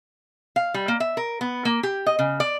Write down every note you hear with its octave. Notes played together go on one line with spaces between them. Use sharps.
F5
G3
A#3
E5
A#4
B3
A#3
G4
D#5
C#3
D5